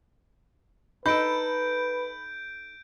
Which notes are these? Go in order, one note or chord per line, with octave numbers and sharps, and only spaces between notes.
D#4 A4 B4 B5 G6 D7